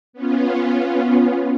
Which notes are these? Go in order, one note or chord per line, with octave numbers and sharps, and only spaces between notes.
B3 C#4 F4